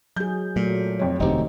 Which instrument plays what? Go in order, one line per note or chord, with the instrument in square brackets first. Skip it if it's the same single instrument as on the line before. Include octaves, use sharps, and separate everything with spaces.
[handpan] F#3 G#4 [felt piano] G6
[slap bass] A#2 [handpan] F#3 A3
[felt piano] F2 C#5
[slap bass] E1 D2 [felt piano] C4 D#4 G4